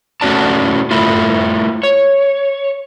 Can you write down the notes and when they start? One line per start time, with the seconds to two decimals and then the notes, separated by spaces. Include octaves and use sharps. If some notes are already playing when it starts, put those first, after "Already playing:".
0.21 A3 C#4 F#4 D5 A5
0.91 A3 E4 F4
1.83 C#5